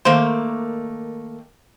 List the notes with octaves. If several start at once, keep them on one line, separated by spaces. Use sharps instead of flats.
D#3 A3 A#3 C5